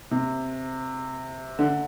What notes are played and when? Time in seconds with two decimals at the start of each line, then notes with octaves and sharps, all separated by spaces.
0.11 C3
1.59 D3